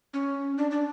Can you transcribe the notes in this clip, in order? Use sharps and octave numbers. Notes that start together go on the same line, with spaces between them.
C#4
D4
D4